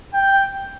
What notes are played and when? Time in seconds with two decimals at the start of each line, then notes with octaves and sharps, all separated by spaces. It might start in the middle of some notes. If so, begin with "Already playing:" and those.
0.14 G5